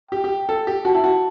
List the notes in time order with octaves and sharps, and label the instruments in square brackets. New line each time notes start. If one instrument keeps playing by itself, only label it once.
[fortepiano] G4 [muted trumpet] G5
[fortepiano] G4
A4
G4
[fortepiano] F#4 [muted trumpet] A5
[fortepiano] E4
F#4